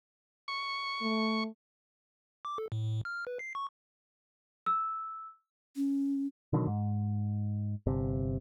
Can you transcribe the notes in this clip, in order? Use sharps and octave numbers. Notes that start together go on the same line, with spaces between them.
C#6
A3
D6
A4
A2
A2
F6
B4
C7
C#6
E6
C#4
B2 D3 D#3 F#3
G#2
G1 C3